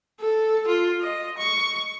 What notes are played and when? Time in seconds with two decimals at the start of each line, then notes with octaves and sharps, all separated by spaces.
0.20 A4
0.67 F4
1.01 D#5
1.37 C#6